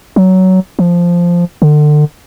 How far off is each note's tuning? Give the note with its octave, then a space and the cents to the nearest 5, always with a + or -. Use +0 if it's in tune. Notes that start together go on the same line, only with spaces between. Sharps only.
F#3 +15
F3 -5
D3 +30